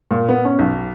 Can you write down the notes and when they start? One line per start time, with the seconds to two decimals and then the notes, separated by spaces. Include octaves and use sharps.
0.11 A#2
0.29 B3
0.45 C#4
0.59 B1